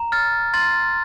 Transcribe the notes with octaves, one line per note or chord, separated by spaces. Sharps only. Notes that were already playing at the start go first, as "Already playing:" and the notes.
Already playing: A#5
F6 A6
C6 A6